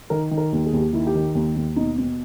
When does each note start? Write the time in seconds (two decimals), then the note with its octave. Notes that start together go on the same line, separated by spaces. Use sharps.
0.10 D#3 A#4
0.31 D#3
0.37 A#4
0.52 D#2
0.66 G#4
0.73 D#2
0.80 G4
0.93 D#3 E4
1.07 G4
1.15 D#3
1.35 D#2
1.56 D#2
1.76 B2 D#4
1.98 B2